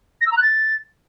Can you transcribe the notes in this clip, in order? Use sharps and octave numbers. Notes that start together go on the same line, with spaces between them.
A#6
E6
A#5
F#6
A6